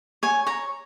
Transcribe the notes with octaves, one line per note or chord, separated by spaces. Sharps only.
C#5 G#5
C#5 A#5